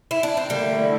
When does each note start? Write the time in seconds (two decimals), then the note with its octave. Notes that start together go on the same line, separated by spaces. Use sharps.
0.11 E4
0.23 D4
0.37 C4
0.50 D3 G3 A3 A#3 E4